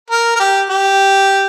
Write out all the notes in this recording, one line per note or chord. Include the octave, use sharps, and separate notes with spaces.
A#4
A#4
G4
G4